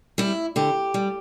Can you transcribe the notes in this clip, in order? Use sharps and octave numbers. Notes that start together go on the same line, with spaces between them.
G3 E4
D3 G4
G3